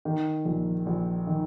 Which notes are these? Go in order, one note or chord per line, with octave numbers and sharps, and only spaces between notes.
D#3
A#1
A#1
D#3